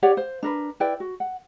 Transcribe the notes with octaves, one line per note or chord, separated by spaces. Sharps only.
G4 C#5 D5 F#5
C5 F5
D4 A#4 B4
E4 B4 D5 G5
F#4
F#5